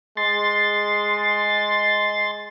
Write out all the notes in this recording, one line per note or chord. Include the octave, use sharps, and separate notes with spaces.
G#3 C6 A6